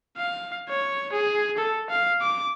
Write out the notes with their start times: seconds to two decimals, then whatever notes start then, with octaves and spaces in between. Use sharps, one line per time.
0.18 F5
0.69 C#5
1.13 G#4
1.57 A4
1.90 F5
2.21 D6